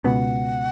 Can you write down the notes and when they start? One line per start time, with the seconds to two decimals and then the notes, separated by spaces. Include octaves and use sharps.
0.04 C#2 B2 B3 F#5